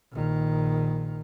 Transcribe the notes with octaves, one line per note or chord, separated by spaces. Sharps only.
A#1 D#3